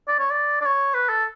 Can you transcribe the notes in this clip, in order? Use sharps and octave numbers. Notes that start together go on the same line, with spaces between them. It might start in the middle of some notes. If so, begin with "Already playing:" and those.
D5
C#5
D5
D5
C#5
B4
A4